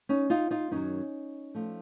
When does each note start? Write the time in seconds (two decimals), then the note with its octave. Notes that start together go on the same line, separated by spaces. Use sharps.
0.09 C#4 D#4
0.30 D#4 F4
0.51 D#4 F4
0.71 F#2 D#3 F#3 C#4 D#4
1.55 F3 A3